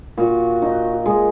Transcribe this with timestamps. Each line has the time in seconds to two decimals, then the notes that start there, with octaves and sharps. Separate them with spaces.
0.18 A#2 F#4
0.62 D#4
1.05 G#3 G#4